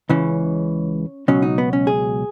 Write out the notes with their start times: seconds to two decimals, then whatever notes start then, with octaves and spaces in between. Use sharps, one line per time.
0.09 C#2 C#3 E3 C#4
1.28 C#2 B2 F#3 C#4
1.42 D#4
1.58 B3
1.73 C#4
1.87 G#4